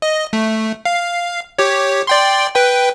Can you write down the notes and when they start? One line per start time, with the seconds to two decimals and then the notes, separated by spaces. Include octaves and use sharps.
0.02 D#5
0.33 A3
0.85 F5
1.59 G4 C#5
2.07 D5 G5 C6
2.55 B4 G5